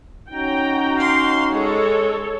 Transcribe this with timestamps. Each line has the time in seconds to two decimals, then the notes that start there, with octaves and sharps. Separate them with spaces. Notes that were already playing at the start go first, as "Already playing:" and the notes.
0.31 C#4 D#4 F#4 G5 A#5
0.98 F5 C6
1.52 G#3 A4 C#5